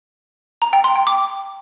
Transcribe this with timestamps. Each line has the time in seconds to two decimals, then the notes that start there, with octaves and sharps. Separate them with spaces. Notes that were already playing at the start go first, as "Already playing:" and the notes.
0.62 A#5
0.73 G5
0.84 C6
0.95 G5
1.07 D6